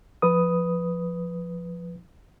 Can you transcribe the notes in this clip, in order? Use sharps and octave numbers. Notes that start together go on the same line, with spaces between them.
F3 B4 D#6